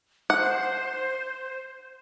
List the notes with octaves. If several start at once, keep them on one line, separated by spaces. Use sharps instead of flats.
C5 F#5